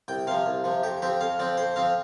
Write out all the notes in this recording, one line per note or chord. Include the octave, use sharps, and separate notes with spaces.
C2 G5
C3 F3 F5
C2
C3 F3
F2 G4
F3 C4 G4
F2 F5
F3 C4 D5
F2 C5
F3 C4 F5